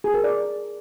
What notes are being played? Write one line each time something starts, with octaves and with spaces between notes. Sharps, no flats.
G#4
A#4
D5